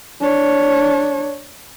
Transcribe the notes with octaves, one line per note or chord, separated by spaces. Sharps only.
D4 C#5